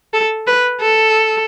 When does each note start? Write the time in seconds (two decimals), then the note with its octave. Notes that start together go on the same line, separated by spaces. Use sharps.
0.13 A4
0.47 B4
0.81 A4